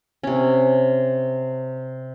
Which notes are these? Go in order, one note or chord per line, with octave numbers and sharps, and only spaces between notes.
C3 C#4